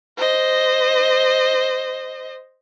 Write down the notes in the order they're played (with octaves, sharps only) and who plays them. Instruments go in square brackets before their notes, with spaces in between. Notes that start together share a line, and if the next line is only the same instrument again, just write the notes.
[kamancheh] C5 D#5